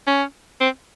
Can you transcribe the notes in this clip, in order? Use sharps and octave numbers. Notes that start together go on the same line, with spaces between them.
C#4
C4